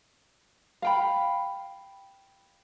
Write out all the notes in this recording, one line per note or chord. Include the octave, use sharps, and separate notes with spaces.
F5 G5 B5